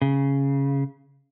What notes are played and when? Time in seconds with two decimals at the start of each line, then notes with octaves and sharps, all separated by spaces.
0.02 C#3